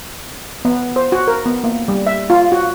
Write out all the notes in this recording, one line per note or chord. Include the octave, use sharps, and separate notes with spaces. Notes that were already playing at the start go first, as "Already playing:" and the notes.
B3
C5
F#4
A#4
B3
A#3
G3
E5
F4
F#4